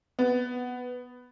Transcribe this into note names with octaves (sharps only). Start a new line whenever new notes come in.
B3